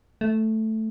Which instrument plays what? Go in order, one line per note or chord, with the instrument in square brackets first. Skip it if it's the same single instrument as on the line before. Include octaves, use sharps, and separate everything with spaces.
[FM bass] A3